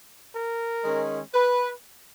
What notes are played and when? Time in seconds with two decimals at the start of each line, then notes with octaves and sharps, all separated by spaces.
0.34 A#4
0.84 D#3 G#3 C#4
1.34 B4